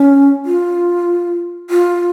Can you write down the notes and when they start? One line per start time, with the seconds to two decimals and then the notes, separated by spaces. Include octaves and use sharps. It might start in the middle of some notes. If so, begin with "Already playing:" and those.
Already playing: C#4
0.45 F4
1.70 F4